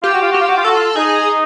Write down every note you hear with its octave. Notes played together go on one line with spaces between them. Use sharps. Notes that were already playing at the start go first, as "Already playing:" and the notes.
F4 G4
F#4
F4
F#4 G4
F4
F#4
F4
F#4 A4
F4
D#4 G#4